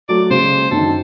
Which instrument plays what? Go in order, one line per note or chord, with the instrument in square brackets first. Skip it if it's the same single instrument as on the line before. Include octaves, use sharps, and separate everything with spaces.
[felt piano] F#3 A3 [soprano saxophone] D5
[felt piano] C#3 G#3 A#3 [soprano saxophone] C5
[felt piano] F#2 D3 D#3 [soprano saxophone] A4